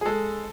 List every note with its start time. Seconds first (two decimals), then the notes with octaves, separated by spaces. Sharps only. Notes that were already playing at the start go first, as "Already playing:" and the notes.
0.01 G#4
0.05 G#3 A4